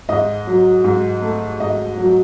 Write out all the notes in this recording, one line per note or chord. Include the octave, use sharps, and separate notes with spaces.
G#2 D#5
F#3
G#2
A3
G#2 D#5
F#3